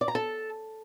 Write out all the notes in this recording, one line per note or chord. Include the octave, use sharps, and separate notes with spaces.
D5
A#5
A4